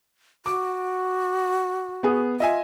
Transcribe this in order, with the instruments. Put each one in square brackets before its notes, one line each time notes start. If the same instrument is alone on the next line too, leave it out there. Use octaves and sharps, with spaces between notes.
[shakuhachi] F#4 [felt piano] D6
[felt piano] B3 G#4
[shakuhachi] F4 [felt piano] D#5 E5 G#5